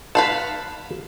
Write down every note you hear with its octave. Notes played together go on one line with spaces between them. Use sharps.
B4 F5 F#5 A5